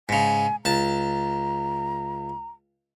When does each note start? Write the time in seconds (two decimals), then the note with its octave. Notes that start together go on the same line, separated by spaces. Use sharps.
0.09 G#2 C#3 G#5
0.65 C#2 A5 A#5